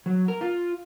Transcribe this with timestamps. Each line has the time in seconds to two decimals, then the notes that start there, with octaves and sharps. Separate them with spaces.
0.06 F#3
0.28 A#4
0.41 F4